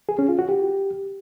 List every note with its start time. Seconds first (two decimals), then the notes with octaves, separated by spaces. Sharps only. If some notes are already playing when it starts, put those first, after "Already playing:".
0.09 G#4
0.19 C#4
0.29 F4
0.39 F#4
0.49 G4